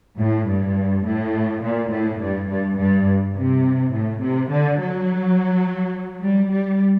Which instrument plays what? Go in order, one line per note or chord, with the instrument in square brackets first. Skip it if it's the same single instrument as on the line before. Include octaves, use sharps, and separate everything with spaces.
[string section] A2
G2
A2
A#2
A2
G2
G2
G2
C3
A2
C3
D3
F#3
G3
G3